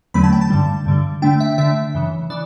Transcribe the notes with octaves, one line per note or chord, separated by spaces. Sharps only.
E2 D3 F#3 A3 C#4 B5
A5
G5
A5
G2 D3 G3
G2 D3 G3
D3 A3 D4 G5
E5
D3 A3 D4 E5
F#2 C#3 E3
C#3 E3 D5